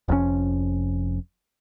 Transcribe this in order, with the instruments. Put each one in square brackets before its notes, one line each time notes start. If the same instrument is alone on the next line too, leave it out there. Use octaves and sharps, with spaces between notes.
[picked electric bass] F1 F2 A2 C#4